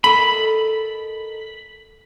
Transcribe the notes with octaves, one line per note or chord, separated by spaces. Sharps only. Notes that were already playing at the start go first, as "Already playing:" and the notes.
A4 A#4 D#5 B5